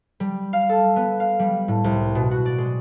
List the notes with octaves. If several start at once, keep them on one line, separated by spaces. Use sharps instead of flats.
G3
F5
A4
B3
F5
G3
A2
C2
B2
F#4
D5
G#3